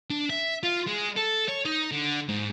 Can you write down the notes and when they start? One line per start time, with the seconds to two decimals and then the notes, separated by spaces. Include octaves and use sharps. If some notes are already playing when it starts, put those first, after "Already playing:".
0.10 D4
0.30 E5
0.63 F4
0.87 G#3
1.16 A4
1.48 C#5
1.65 D#4
1.92 D3
2.29 G#2